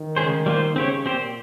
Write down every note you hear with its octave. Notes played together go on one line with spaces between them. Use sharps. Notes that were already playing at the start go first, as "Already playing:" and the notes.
Already playing: D#3
C#3 G#3 C#4 G#4 C5
G3 A#3 F4 C5
C#3 C4 G4 C#5
A#2 C4 G4 C5